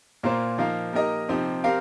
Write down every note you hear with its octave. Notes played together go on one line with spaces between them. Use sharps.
A#2 A#3 F4 C5
F3 A#3 D#4 A#4 F5
A#3 D#4 G4 A#4 D#5
C3 F3 C4 D#4 G4
C4 G4 A#4 F5